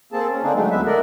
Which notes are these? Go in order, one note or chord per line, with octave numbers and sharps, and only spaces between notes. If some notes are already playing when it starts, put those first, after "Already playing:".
A#3 C4 G#4 A4 A5
C#4
D3 A#3 C4 D4 D#4 G#4
F#3 G#3 A3 D#4
D2 B3 B4 E5
D4 E4 A4 A#4 D5 D#5